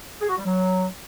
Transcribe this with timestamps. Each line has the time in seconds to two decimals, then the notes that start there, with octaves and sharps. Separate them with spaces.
0.21 G#4
0.29 F#4
0.37 G3
0.45 F#3